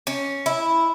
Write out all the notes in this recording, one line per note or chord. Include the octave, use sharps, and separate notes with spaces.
C#4
E4